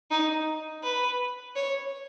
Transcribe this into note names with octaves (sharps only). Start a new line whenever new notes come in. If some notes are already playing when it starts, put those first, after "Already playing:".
D#4
B4
C#5